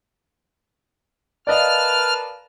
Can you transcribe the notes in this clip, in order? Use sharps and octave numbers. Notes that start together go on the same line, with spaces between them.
A#4 B4 D5 D#5 F5 A5 F6